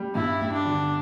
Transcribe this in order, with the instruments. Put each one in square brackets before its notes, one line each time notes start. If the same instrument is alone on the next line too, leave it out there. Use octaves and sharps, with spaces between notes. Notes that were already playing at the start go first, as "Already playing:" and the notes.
Already playing: [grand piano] G3
[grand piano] G2 [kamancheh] E4
[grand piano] G3
[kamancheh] D4
[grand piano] D3